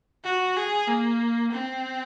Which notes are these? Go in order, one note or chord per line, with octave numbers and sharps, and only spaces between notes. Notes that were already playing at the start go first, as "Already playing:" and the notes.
F#4
G#4
A#3
C4